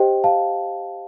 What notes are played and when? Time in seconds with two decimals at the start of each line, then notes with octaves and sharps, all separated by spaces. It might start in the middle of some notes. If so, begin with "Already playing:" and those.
Already playing: G4 C5 D#5 G5
0.24 F5 A5